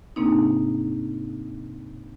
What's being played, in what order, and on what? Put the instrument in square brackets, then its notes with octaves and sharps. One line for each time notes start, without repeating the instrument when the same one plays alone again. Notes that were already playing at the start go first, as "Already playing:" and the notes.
[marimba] G#2 C3 A#3 C4 D4 D#4